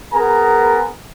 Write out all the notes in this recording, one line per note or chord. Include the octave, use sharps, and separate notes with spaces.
B3 G#4 A#4 G#5 A#5